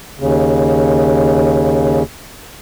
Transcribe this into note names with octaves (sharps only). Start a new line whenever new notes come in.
D#2 C#3